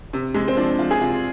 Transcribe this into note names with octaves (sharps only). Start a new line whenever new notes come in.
C3
C3 G#3
C4
F3 D4
F3 F4
G#4
C3 F4